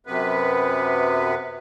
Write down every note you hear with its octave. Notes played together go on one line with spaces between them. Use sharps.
F#2 C3 B3 B4